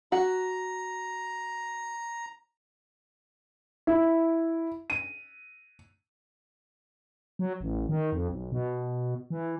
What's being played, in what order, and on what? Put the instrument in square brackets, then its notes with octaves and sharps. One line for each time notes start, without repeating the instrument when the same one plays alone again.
[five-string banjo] F#4 [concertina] A#5
[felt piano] E4
D#7
[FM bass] F#3
A1
D#3
F2
B1
B2
E3